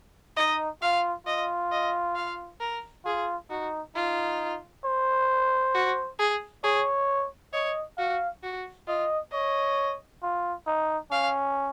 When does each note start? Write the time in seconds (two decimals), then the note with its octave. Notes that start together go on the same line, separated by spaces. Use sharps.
0.37 D#4 D#5
0.82 F4 F5
1.27 F4 D#5
1.72 D#5
2.15 F5
2.60 A#4
3.05 F4 G#4
3.50 D#4 F#4
3.95 D#4 F4
4.85 C5
5.75 F#4
6.19 G#4
6.64 G#4 C#5
7.53 C#5 D#5
7.98 F#4 F5
8.43 F#4
8.88 F4 D#5
9.33 C#5 D#5
10.23 F4
10.67 D#4
11.11 C#4 F5